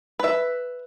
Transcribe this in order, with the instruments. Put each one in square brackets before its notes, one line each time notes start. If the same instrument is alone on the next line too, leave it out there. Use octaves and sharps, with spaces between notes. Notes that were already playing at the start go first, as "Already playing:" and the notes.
[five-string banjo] B4 E5